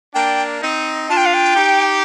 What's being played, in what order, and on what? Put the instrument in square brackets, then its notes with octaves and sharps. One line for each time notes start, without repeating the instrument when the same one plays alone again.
[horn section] A#3 D4 [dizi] G5
[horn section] C4 D#4
[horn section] D4 F4 [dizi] A5
[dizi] G5
F5
G5
[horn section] D#4 G4